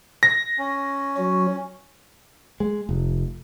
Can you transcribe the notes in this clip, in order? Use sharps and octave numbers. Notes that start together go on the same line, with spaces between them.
A#6
C#4
F#3 F#4
G#3
F1